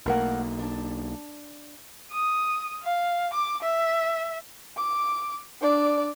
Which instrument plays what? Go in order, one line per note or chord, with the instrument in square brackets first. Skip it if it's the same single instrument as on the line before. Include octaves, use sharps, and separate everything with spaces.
[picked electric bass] B1 A#3 [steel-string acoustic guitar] A3 A#4 F#5
[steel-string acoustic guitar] D4 A5
[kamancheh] D#6
F5
D6
E5
D6
D4 D5